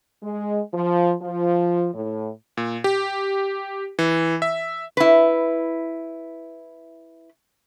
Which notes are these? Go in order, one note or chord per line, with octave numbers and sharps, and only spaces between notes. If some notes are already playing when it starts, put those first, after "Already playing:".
G#3
F3
F3
A2
A#2
G4
E3
E5
E4 B4